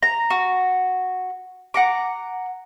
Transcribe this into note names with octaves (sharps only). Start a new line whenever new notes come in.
A#5
F#4
F#5 A#5 D6